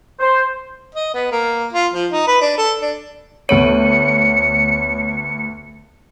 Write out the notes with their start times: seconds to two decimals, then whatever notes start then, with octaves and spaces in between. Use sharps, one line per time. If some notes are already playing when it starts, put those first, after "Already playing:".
0.20 C5
0.95 D#5
1.14 B3
1.32 A#3
1.73 F4
1.93 F3
2.12 D#4
2.27 B4
2.41 D4
2.58 A4
2.82 D4
3.49 D2 B3 C#5 C#7 D#7